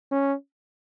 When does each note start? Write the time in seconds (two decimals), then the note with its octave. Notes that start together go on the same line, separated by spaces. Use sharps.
0.11 C#4